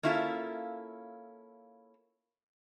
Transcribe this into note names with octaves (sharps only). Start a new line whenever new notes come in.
A#3 C#4 E4 F4 A4 E5